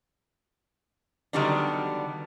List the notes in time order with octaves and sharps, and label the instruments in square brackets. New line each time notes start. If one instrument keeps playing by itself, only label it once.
[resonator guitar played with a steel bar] D3 D#3 F#3 G3 B3 D4